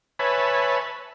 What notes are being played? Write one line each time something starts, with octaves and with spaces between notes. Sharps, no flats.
B4 C#5 E5 G#5 A5 B5